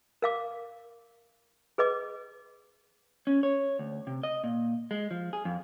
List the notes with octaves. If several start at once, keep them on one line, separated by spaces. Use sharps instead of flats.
A#4 F5 D6
G#4 B4 D#5 D6
C#4
C#5
D2
C3
D#5
A#2
G#3
F3
G#4
F2